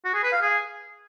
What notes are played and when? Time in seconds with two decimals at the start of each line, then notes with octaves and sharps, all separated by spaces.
0.05 F#4
0.14 G#4
0.23 B4
0.32 F5
0.42 G#4